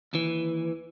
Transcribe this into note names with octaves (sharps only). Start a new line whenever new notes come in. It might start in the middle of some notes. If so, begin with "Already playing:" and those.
D#2 E3